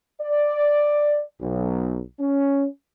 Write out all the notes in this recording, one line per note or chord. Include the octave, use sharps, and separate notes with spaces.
D5
B1
C#4